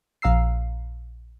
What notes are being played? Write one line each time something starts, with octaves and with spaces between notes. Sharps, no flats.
A#1 F5 A#5 E6 C7